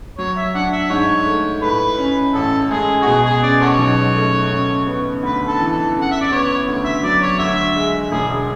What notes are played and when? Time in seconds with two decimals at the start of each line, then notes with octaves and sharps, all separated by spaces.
0.18 F#3 C#5
0.37 E5
0.54 D4 F#5
0.73 E5
0.90 G#2 C#5
1.27 A3
1.62 A2 B4
1.98 C#4
2.34 A1 A4
2.70 G#3 G#4
3.02 F#4
3.06 B2 G#4
3.25 G#4
3.42 C#4 D5
3.61 F#4 A4 C#5
3.78 B1
4.15 A3
4.51 C#3
4.87 B3
5.23 D2 B4
5.47 A4
5.60 E3
5.72 A4
5.96 C#3
6.02 F#5
6.11 E5
6.22 D5
6.32 B3 C#5
6.68 D2
6.85 E5
7.03 F#3 D5
7.22 C#5
7.39 D2 E5
7.76 G#3
8.12 E1 G#4